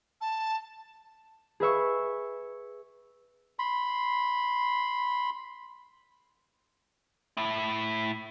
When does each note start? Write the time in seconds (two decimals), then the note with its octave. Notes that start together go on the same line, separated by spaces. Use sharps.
0.21 A5
1.60 G#4 B4 E5 C#6
3.59 B5 C6
7.37 A2 E4